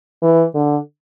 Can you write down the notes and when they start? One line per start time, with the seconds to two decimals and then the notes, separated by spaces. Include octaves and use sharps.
0.22 E3
0.55 D3